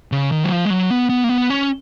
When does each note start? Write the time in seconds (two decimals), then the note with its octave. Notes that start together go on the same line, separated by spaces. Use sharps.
0.12 C#3
0.32 D#3
0.43 F#3
0.52 F3
0.65 G#3
0.70 F#3
0.90 B3
1.09 B3
1.24 A#3
1.29 B3
1.50 C#4